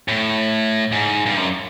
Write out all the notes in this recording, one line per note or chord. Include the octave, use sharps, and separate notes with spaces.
A2
G#2
G2
F#2